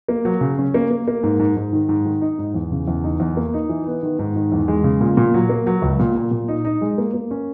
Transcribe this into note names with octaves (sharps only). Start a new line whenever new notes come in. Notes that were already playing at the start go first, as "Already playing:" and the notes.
A#3
F#3
C#3
C#4
A#3
A#3
A#3
G#2
G#2
G#2
D#3
G#2
D#3
D#4
G#2
E2
C#3
E2
D#4
E2
A#3
D#4
E3
B3
D#3
G#2
D#3
E2
G#3
C#3
A#2
A#2
F#3
A#3
F#3
C#2
A#2
A#2
A#2
D#4
D#4
G#3
A#3
A#3
C#4